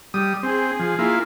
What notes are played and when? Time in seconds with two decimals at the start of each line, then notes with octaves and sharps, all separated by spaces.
0.14 G3 D#6
0.43 C4 G#4
0.80 F3
0.99 A#3 E4 F4